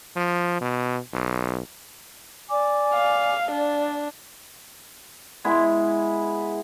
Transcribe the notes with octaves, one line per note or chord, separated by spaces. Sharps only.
F3
B2
B1
D5 G#5 D6
F5
D4 D5
G#3 B3 E4